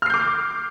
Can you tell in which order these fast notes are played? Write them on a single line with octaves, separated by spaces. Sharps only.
F6 C7 G6 D6